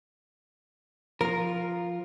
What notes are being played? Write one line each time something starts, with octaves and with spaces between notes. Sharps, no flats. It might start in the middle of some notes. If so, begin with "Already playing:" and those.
F3 F4 A#4